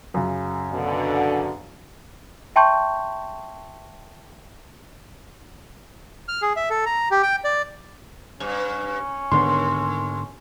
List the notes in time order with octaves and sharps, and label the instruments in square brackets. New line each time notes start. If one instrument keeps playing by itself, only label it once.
[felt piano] F#2 C#3
[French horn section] B2 D3
[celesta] E5 G5 A5 C6 C#6 G6
[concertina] F6
G#4
E5
A4
A#5
G4
G5
D5
[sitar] G2 [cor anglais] C#4
[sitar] D#2 [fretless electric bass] G#2 D3 B3 [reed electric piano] C6